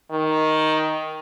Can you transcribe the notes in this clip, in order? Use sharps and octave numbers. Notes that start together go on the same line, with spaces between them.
D#3